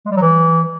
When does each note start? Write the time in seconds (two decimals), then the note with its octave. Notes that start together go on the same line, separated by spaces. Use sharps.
0.05 G#3
0.11 G3
0.16 F#3
0.22 E3